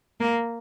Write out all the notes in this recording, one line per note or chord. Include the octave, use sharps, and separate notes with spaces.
A#3